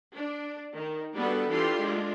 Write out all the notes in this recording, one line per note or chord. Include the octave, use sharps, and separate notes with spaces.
D4
D#3
G3 B3 D4 F#4 A4 B4
E3 D4 F4 G4 A4 C6
G#3 D4 F4